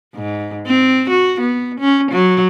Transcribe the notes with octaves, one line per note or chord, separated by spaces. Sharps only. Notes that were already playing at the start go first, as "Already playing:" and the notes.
G#2
C4
F#4
B3
C#4
F#3